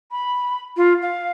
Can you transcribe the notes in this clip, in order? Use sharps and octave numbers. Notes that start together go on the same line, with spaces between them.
B5
F4
F5